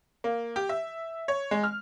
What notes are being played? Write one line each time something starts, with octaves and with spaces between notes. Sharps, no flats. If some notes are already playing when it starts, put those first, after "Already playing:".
A#3
G4
E5
C#5
G#3
F6